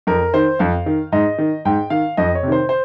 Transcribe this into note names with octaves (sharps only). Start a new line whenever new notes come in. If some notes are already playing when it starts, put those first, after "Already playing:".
F2 A#4
D#3 C5
F2 F5
D#3
G#2 D#5
D#3
G#2 G5
D#3 F5
F2 D#5
C#5
C3
D#3 C5
C5